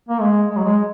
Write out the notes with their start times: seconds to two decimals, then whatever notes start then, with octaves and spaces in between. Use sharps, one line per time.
0.09 A#3
0.21 G#3
0.51 G#3
0.57 F#3
0.65 G#3